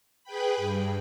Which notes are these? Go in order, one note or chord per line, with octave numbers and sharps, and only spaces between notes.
G#4 B4 G5 B5
G2